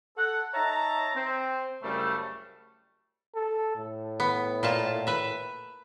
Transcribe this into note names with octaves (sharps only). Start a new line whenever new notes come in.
A4 F#5
D#4 C#5 E5 A5 A#5
C4
C2 F#2 C#3 G3 A3
A4
A2
B3
A#2 F4 A5
B4 E5